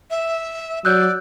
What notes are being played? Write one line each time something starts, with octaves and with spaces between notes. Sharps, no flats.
E5
F#3 D5 E6 F#6 G6